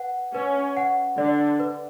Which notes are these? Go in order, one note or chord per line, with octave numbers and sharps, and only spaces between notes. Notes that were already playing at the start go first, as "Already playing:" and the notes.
Already playing: B4 F#5
C#4 B4
F#5
D3 D4 D5
B4